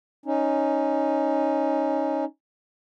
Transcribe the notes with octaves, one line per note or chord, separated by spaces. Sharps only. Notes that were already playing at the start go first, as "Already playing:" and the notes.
C#4 D#4